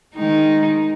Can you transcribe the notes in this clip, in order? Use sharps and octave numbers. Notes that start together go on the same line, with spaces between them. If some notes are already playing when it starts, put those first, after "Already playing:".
D#3 G#3 D#4